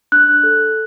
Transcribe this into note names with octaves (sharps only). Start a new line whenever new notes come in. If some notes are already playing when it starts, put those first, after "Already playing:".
D4 F#6
A4